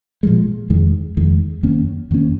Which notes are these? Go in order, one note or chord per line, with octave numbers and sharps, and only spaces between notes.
A#2 F3 G#3
F2 D#3 G#3
F2 D#3 G#3
F#2 D#3 A#3 C#4
F#2 D#3 A#3 C#4